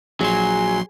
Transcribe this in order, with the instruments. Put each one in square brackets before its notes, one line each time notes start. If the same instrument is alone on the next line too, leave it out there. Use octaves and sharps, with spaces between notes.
[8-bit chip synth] A#1 C6 [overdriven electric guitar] F#3 [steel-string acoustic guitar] G#4